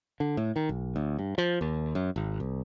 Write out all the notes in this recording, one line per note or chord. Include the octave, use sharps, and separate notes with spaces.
D3
A2
D#3
B1
D2
G2
F3
D#2
F#2
G#1
C2